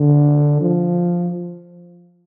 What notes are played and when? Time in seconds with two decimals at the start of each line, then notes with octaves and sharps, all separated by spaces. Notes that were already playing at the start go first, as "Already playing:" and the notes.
Already playing: D3
0.61 F3